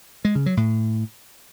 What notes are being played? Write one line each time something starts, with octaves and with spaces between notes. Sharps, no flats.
G#3
C#3
F#3
A2